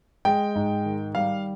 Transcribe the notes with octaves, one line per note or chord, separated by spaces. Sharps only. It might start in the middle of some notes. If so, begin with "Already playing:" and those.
G#3 G5
G#2
D#3
G3 F5